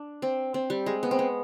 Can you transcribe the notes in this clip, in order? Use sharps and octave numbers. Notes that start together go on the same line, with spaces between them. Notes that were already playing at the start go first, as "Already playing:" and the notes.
Already playing: D4
C4
C4
G3
G#3
B3
C4
B3